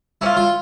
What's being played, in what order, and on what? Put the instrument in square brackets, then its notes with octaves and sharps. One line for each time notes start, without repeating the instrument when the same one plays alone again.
[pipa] A#3 C#4 F4 [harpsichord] E4
[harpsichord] F4